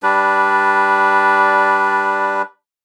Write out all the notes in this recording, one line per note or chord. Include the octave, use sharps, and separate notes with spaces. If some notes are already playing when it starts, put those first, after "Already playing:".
G3 D4 B4